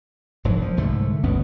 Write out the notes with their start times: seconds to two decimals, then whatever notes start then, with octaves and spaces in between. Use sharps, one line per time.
0.45 E1 G#2 F3 F#3
0.61 F3
0.77 C2 G#2 D3 A3
1.23 G1 D2 B3 C#4